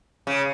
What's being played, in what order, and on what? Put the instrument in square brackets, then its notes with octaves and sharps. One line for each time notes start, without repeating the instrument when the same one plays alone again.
[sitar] C#3